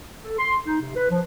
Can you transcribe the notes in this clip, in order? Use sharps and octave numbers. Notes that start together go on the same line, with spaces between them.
A4
C6
D#4
C3
B4
F3